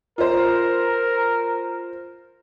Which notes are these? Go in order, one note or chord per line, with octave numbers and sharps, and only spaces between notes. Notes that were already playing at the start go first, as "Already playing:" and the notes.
F4 A#4 C5